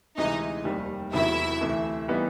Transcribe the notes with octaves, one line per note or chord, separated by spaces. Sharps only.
D2 C3 E3 G#3 D#4 D#5
F1 D#2 D#3 G3
E1 E2 C3 D#3 F#3 E4 E5
D2 C3 E3 A3
E3 G3 B3 D#4